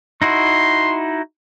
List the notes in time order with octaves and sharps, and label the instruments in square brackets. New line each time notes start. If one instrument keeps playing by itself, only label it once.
[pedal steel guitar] D#4 E4 F#4 [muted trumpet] C6